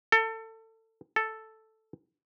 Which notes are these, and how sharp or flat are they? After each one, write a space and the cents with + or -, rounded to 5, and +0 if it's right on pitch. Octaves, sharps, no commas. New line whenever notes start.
A4 +25
A4 +0